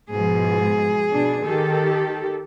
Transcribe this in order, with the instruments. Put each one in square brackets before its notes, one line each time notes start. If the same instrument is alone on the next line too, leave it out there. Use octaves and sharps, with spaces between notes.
[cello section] G#2 B2 F3 [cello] G#4
[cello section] B2 D4
D#3 G4 A4